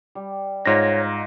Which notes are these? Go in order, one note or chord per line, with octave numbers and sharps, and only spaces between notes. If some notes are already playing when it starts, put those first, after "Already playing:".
G3
G#2 D#4 F4 C#5 A#6